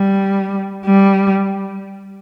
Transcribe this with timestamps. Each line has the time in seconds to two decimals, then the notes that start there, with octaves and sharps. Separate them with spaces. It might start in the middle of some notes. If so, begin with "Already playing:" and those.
Already playing: G3
0.85 G3